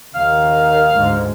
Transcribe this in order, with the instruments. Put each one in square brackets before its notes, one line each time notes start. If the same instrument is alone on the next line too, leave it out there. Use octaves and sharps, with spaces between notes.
[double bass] D#2 D#3 [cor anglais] F5
[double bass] D2 G#2